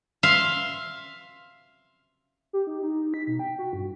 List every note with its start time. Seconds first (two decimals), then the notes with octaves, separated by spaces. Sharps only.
0.23 E5 F5 C6
2.53 G4
2.67 D#4
2.83 D#4
3.14 B6
3.27 B2
3.39 G5
3.59 F#4
3.73 G2